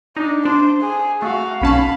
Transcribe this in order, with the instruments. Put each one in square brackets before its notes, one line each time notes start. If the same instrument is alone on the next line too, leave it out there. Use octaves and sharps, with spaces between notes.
[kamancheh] D4 [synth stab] D#4
[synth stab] D4 [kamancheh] C5
[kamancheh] G#4
[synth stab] A3 [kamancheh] F#4 F5
[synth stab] B1 C#4 A5 [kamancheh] F5 B5